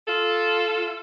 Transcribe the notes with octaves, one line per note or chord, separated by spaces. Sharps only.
F4 A4